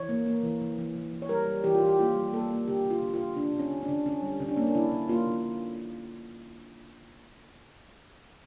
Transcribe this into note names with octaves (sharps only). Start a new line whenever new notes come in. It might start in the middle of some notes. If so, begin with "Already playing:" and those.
Already playing: E3 C#5
A#3
A#3
E3
E3
E3
E3
E3
C#5
G3 A#4
G3
E3 G4
F4
E3 G4
A#3 F4
G3
A#3 A4
A#3
D3 G4
D3
F4
D3
F4
D3
D3 D4
D3
C#4
D3
D4
D3
D3 C#4
G3
D3 C#4
D4
A#3 C#4
D4
D3 E4
D3
A#3 F4
D3